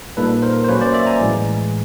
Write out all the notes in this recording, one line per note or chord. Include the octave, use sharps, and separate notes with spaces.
A#2 G3 A#3 D#4 A4 B4
A#4 C5
C5
F#3 A#3 C#4 B4 C#5
C5 D5
D5 E5
G#5 A#5
A2 E3 G#3